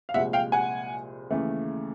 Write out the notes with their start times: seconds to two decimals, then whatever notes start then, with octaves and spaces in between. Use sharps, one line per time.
0.09 F5
0.14 C2 A#2 F3 G#3 E5 F#5
0.33 F5 G5
0.52 F#5 G#5
1.30 D#2 C#3 E3 A3